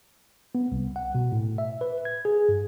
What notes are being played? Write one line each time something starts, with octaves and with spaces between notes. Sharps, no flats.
B3
C2
F#5
B2
A2
E5
B4
G#6
G#4
G2